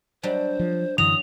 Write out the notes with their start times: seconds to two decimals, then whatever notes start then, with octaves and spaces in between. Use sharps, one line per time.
0.23 F#3 G3 D4 C5
0.59 F3
0.98 F#2 D3 E3 F#3 D#6 F7